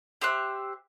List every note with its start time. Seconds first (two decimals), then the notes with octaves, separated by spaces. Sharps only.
0.21 G4 C5 E5 F#6